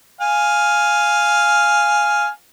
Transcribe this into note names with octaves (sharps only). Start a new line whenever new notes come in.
F5 G#5